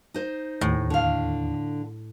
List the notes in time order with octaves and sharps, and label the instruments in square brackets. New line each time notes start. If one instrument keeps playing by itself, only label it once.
[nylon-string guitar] D#4 C5
[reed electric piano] D#2 [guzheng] A2
[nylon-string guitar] D3 F5